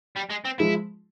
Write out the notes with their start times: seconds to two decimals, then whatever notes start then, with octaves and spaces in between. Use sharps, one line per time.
0.16 G3
0.30 G#3
0.45 C4
0.59 F3 G#3 E4